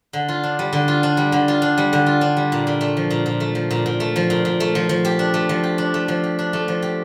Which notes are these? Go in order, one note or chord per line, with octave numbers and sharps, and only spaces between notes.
D3
F4
D4
G3
D3
F4
D4
G3
D3
F4
D4
G3
D3
F4
D4
G3
A#2
A#2
A3
F3
A#2
A#2
A3
F3
A#2
A#2
A3
F3
A#2
A#2
A3
F3
F3
G4
D4
A3
F3
G4
D4
A3
F3
G4
D4
A3
F3
G4